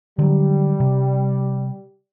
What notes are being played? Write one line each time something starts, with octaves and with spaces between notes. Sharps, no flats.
D3 F#3 G3
C3